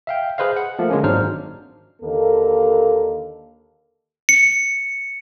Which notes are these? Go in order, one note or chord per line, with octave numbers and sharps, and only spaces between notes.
E5 F5 G5
G#4 B4 C5 D#5 F5
F#5
F3 A3 A#3
D3 G#3 A#3 C#4
G#1 F#3 D4 D#4 C5 F6
D#2 D3 A#3 A4
C#7